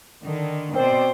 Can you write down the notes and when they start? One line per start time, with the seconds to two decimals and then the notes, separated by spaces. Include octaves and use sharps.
0.25 D3 D#3
0.75 B2 C4 C5 D5